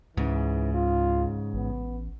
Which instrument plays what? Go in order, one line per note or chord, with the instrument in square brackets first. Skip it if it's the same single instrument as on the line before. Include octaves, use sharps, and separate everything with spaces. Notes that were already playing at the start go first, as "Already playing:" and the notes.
[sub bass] C#2 [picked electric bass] G#2 C#3 [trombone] E3
[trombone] F4
[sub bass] A1 [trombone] B3